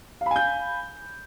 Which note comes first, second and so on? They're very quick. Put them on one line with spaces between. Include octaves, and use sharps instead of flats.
F5 B5 G#5 G6